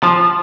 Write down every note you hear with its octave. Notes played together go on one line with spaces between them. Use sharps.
F3